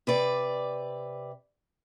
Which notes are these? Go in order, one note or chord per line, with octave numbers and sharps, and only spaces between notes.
C3 B4 D5